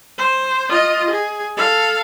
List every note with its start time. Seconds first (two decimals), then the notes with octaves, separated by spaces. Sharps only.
0.18 C5
0.69 F4 D#5
1.11 G#4
1.57 A4 F5